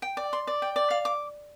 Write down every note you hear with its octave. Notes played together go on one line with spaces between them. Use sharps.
G5
D5
C6
D5
G5
D5
F5
D6